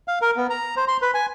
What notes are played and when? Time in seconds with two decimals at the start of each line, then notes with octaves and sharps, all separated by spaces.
0.08 F5
0.22 A#4
0.37 B3
0.50 A#5
0.77 C5
0.88 C6
1.02 B4
1.14 G#5